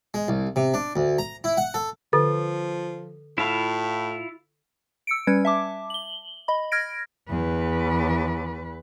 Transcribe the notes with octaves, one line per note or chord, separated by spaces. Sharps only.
G#3
C2
C3
D4
D2
A#5
E4
F#5
A4
D3 F3 A4
A2 E4 F4 F5
E6 C#7 D7
G3 C#4 B4 G#6
E5 A5 D6
F#7 G7
D#5 B5
F6 G#6 A#6 D7
E2 B4